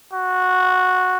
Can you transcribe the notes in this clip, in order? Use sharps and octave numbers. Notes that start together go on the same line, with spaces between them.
F#4